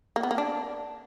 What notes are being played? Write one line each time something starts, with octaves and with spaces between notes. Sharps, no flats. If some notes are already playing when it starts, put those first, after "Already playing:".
A#3
B3
A#3
D4